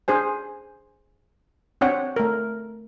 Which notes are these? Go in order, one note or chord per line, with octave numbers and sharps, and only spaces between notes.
D4 G#4 C5 G#5
C4 D4 C#5 F#5 G5
A3 A#4